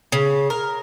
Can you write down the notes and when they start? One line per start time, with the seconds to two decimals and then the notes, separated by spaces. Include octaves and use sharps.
0.12 C#3
0.50 A#4